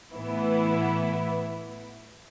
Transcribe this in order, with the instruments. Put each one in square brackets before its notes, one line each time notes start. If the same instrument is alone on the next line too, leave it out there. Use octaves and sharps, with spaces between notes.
[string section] A2 E3 B3 E4